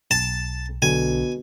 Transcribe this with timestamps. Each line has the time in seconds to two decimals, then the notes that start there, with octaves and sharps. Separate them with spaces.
0.11 B1 A5
0.82 B1 B2 D3 G#5